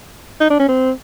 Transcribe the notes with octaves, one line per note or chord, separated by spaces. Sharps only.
D#4
D4
C#4
C4